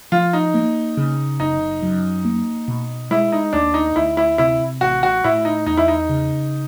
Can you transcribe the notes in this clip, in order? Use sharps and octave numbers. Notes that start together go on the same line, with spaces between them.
F3 F4
D#4
A#3
C#3
F#1 D#4
F#2
A#3
B2
G#3 E4
D#4
D#2 D4
D#4
D2 E4
E4
C3 E4
A1 F#4
F#4
A2 E4
D#4
E2 D#4
E4
D#4
C#3